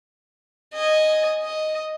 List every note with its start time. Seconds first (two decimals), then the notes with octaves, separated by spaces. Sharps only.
0.74 D#5 G#5
1.43 D#5